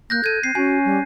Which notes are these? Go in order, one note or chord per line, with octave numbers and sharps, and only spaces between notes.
A#3 F#6 G6 A#6
A4 G#6 D#7
C4 C7
C#4 F#4 G#5
G3